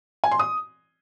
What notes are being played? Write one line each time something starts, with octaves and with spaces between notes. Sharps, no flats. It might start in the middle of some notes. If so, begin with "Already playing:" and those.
G#5
C6
D#6